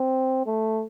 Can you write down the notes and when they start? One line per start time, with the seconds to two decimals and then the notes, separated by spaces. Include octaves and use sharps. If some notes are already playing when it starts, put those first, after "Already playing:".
Already playing: C4
0.46 A3